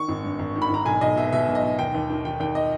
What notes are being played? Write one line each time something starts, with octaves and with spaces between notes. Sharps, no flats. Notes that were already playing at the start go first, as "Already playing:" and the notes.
Already playing: D#3 C#6
G#1
G2
G#1
D#3
B5
G#1 A#5
B1 G#5
B1 D#5
B2 E5
B2 E5
B1
D#5
B1
D#2 G5
D#2
D#3
D#3 G5
D#2 G5
D#5